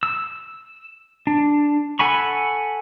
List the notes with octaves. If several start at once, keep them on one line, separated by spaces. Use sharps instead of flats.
E6
D4
A4 F#5 G#5 B5 C#6